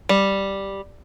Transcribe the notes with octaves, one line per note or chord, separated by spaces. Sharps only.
G3